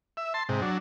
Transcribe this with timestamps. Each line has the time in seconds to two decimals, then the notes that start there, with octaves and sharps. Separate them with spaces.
0.17 E5
0.34 A5 C6
0.49 G#2 C3
0.62 F#3 D4